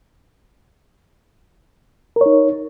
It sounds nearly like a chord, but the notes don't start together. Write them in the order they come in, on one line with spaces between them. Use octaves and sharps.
A#4 C#5 D#4